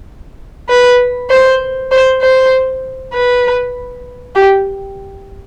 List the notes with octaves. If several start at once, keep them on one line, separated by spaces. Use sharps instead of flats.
B4
C5
C5
C5
B4
G4